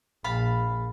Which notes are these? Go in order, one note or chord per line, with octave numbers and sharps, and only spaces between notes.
A#1 F5 A5 B5